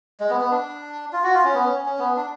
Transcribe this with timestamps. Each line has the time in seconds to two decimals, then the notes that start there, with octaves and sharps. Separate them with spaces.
0.20 G#3
0.30 B3
0.41 B3
0.51 D4
1.13 F4
1.24 F#4
1.34 F4
1.44 C#4
1.54 B3
1.64 C#4
1.86 C#4
1.99 B3
2.17 D4